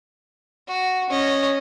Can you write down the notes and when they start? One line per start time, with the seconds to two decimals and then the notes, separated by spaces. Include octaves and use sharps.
0.68 F#4
1.10 C#4 D#5